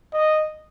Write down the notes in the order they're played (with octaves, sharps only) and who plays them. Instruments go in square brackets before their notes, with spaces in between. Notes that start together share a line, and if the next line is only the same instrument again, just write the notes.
[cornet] D#5